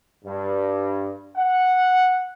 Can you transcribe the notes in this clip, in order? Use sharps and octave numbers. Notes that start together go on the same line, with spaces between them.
G2
F#5